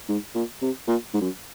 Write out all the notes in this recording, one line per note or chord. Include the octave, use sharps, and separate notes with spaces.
G#2
A#2
C3
A#2
G#2
F#2